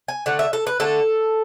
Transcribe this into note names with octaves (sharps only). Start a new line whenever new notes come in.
G#5
D3 A3 F#5
E5
A4
B4
D3 A3 A4